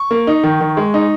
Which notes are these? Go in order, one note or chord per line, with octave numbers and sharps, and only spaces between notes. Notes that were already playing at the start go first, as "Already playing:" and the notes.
Already playing: C#6
A#3
D#4
D#3
D#3
G#3
D#4